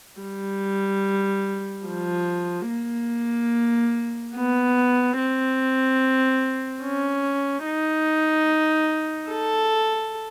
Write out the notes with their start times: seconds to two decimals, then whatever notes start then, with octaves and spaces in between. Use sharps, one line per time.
0.21 G3
1.86 F3
2.69 A#3
4.36 B3
5.18 C4
6.84 C#4
7.66 D#4
9.31 A4